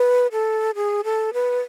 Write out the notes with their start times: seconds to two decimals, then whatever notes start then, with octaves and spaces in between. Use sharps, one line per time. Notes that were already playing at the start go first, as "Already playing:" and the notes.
Already playing: B4
0.32 A4
0.75 G#4
1.04 A4
1.33 B4